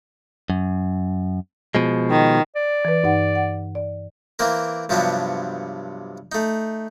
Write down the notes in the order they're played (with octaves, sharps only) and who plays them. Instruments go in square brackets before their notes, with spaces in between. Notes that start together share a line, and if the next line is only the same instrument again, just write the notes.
[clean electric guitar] F#2
B2 F3 G#3
[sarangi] D#3
[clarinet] D5
[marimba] E3 B4
G2 D#4 F#5
F#5
D5
[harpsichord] E3 A#3 C4 A#4
G2 C3 F3 F#3 B3 D4
A3 D#4